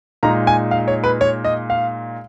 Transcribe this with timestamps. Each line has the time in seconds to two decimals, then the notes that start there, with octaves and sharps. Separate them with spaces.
0.23 A#2 G#3 D#4 A#5
0.47 G#5
0.71 F5
0.88 C#5
1.04 B4
1.21 C#5
1.44 D#5
1.70 F5